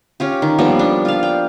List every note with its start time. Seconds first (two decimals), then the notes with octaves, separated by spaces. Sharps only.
0.20 C#4 F4 G4
0.42 D#3
0.58 F3 G3 A#3 B3
0.79 D4
1.05 F4 F5
1.23 G5